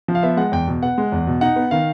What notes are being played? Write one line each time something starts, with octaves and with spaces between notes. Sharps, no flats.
F3
F5
B3 E5
G#3 F#5
E2 G5
B2
B3 F#5
G#3
E2
B2
D#4 F#5
B3
D#3 F5